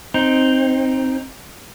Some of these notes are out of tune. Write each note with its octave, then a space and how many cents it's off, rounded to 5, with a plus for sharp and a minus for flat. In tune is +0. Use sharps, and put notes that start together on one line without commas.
C4 +5 D#4 +0